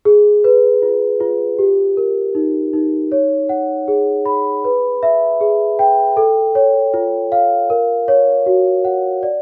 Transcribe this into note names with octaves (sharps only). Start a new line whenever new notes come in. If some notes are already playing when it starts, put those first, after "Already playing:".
G#4
B4
F4
F4
G4
A#4
D#4
D#4
C#5
F#5
G#4
B5
B4
E5
G#4
G5
A4
C#5
F4
F5
A#4
C#5
F#4
F#5
D5